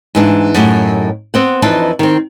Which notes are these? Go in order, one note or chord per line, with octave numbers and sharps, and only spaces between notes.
G#2 E3 D4
F#2 A2 D#4 G4
B3 C4 F#5
F2 E3 D4 D#4 B4 A5
D#3 C4